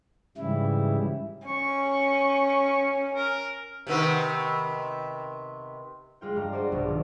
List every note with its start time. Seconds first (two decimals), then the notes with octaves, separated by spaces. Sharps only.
0.37 G#2 C#3 E3 G3 E4
1.47 C#4 C#6
3.15 A#4
3.87 C3 D#3 B3
6.21 G3 G#3 F4 G5
6.36 G2 G3 F5 A#5
6.53 F#4 G#4 C5 D5
6.72 A#1 G2 B2 F#3
6.88 D#3